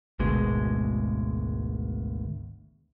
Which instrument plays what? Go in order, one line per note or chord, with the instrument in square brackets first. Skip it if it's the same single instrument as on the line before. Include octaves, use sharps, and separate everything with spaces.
[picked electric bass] G#1 D2 B2 G#3